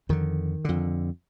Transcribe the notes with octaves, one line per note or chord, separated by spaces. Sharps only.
F2 D3 D#3
F2 D3